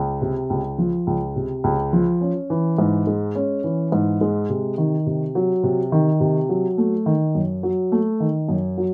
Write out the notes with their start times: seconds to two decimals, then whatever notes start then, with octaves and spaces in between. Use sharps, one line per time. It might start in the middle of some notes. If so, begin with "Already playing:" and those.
Already playing: C#2
0.22 C3
0.50 C#2
0.78 F3
1.07 C#2
1.36 C3
1.64 C#2
1.93 F3
2.21 C#4
2.50 E3
2.78 G#2
3.07 G#3
3.35 C#4
3.64 E3
3.92 G#2
4.21 G#3
4.50 C3
4.78 D#3
5.07 C3
5.35 F#3
5.63 C3
5.92 D#3
6.20 C3
6.49 F#3
6.78 A3
7.06 D#3
7.35 F#2
7.63 F#3
7.92 A3
8.20 D#3
8.48 F#2
8.78 F#3